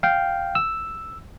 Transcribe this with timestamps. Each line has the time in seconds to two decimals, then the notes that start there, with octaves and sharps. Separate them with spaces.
0.03 F5 G5
0.55 E6